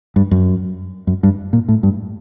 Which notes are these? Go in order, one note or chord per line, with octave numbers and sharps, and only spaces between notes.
G2
F#2
F#2
G2
A#2
A2
G2